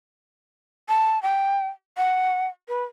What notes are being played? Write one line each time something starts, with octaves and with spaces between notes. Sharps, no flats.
A5
G5
F#5
B4